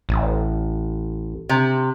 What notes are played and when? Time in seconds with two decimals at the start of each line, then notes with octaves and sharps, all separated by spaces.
0.09 A1
1.49 C3